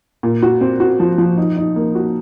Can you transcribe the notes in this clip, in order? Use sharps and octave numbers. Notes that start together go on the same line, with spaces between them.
A#2
F#4
C4
F#4
F3
F3
D#4
D#4
A#3
F#4